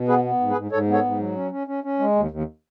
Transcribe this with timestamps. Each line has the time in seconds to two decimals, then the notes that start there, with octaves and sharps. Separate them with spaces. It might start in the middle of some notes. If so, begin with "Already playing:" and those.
Already playing: B2
0.08 B3 G#4 B4
0.24 B3
0.40 G#2
0.50 G#4 B4
0.56 G#2
0.71 G#2 A4 C#5
0.88 B3
0.93 A4 C#5
1.04 G#2
1.19 F#3
1.36 C#4
1.51 C#4
1.67 C#4
1.84 C#4
1.99 G#3
2.15 D#2
2.31 D#2